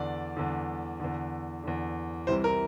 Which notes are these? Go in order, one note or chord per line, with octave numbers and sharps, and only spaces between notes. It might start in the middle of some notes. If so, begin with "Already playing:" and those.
Already playing: E2 D3 D5
E2 D3
E2 D3
E2 D3
C2 C3 E3 C5
A#4